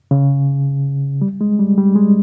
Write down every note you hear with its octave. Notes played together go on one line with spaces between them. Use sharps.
C#3
G3
G#3
G3
G3
G#3